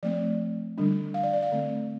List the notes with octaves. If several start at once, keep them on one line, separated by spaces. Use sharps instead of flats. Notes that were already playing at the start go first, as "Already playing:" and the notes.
F3 A3 C4 D5
D3 G3 D4
F5
D5
D5
F5
D3 A3 C4